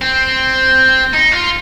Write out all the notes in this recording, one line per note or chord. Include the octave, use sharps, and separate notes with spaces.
C4
D#4
F4